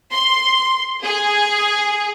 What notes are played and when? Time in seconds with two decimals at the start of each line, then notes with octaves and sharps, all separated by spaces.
0.13 C6
1.04 G#4